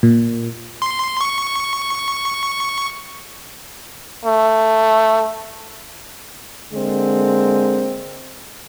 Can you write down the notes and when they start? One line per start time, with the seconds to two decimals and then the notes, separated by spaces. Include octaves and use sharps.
0.03 A#2
0.82 C6
1.21 C#6
4.25 A3
6.73 D3 G#3 A#3 C4